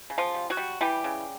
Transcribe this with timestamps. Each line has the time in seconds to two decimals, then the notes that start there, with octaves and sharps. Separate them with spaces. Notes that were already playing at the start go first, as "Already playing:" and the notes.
0.10 C#3
0.18 F3 F4
0.34 G3
0.50 F#3 F#4
0.57 G3
0.81 E3 G3 G4
1.04 C#3